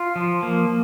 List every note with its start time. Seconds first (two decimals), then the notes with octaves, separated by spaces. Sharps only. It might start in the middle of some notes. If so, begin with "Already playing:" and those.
Already playing: F4
0.16 F3
0.43 A#3